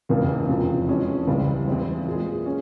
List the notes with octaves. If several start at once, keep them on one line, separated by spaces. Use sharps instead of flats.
F1 E2 C#3 E3 A#3
E1 E2 C3 F3
F2 E3 G#3 C#4
C#2 C#3 E3 G3 C4
E2 E3 G#3 C4 E4
A#2 G#3 E4 G#4
C#4